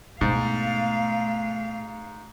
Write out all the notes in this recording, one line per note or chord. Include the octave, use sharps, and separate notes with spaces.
G#2 B2 A3 F5